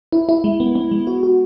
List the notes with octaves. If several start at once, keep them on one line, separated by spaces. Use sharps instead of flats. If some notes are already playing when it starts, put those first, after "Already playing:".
E4
E4
G#3
B3
B3
G#3
F#4
F#4